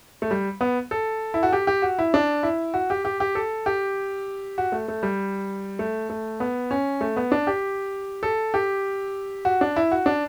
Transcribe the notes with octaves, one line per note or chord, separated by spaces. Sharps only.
A3
G3
B3
A4
E4
F#4
G4
G4
F#4
E4
D4
E4
F#4
G4
G4
G4
A4
G4
F#4
A3
A3
G3
A3
A3
B3
C#4
A3
B3
D4
G4
A4
G4
F#4
D4
E4
F#4
D4